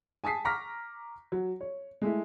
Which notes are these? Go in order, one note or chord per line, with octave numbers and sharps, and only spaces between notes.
G#5 A5 D#6 B6 C7
A#5 C#6 D6 F6 A#6 B6
F#3
C#5
G#3 A3 E4